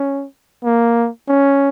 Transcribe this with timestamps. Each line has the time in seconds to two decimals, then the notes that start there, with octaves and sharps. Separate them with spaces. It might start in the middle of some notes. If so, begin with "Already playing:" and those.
Already playing: C#4
0.64 A#3
1.28 C#4